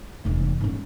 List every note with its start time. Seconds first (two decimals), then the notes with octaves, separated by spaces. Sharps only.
0.25 F1 E2
0.61 G#2 C#4